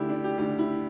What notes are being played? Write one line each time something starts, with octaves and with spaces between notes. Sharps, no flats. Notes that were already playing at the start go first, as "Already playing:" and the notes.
Already playing: D2 D3 E4 G4
D4
G4
D2 D3 G4
E4